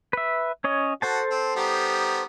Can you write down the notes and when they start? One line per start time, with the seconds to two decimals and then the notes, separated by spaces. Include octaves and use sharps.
0.13 B4 E5
0.64 C#4 C#5 D#5
1.02 F#4 A4 C5 A5
1.31 C4
1.56 G3 B3 D#4